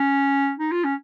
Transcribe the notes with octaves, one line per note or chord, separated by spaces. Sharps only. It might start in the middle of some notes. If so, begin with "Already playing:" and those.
Already playing: C#4
D#4
F4
C#4